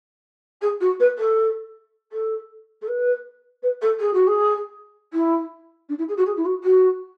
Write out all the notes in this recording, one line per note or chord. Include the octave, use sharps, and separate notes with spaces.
G#4
F#4
B4
A4
A4
A4
B4
B4
A4
G#4
F#4
G#4
E4
D4
E4
G#4
F#4
G#4
E4
F#4
F#4